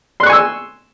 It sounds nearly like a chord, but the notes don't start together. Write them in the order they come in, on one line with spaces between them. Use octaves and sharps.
C6 F#6 C#6 G#5 E6